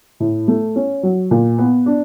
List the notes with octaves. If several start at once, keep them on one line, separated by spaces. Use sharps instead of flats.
A2
A3
C#4
F#3
A#2
B3
D4